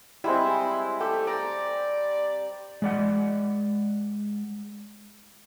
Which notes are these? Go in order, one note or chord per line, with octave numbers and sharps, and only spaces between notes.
G3 G#3 C4 E4
A3 G4
D5 A#5
G#3 D5 F#5